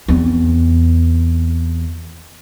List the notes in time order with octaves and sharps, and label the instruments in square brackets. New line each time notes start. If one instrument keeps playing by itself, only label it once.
[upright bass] E2 C4